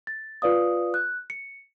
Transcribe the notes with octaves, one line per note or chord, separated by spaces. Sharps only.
A6
F4 B4 D5 F5 D#6
F#6
C#7